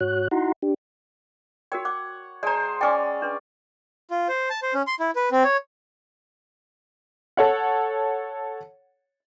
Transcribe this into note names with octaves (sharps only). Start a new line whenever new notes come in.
G#2 F#4 C#5 F#6
D#4 E4 F#4 F#5 A#5 C6
D4 G4
F#4 A#4 C#5 G5
F#5 D6
G#3 C5 D5 A5 A#5
C#4 D5 G5 G#5 D6
D4 B4 C6
F4
C5
A5
C5
C#4
C6
E4
B4
C4
C#5
A4 C#5 F#5